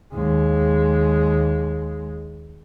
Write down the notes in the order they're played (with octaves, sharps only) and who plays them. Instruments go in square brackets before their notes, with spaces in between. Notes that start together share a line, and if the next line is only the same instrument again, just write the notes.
[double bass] D#2 G#3